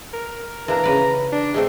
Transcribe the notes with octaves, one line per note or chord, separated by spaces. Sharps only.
A#4
E3 A#3 D4 A#5
C#3 B4 D5
D4
G#3 A3 C4